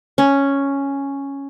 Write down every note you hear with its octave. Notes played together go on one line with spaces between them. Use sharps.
C#4